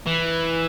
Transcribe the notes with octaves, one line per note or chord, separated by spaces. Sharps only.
E3